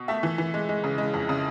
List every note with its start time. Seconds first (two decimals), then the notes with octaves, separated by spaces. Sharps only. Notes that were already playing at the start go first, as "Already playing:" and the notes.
Already playing: B2
0.08 A3 E5
0.23 E3
0.38 E3
0.54 G#3
0.69 G#3
0.84 C#3
0.98 G#3
1.14 F2
1.29 C#3